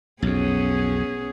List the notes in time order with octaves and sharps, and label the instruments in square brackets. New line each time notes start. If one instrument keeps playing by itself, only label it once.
[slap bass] B1 F2 [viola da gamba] B3 C#4 G#4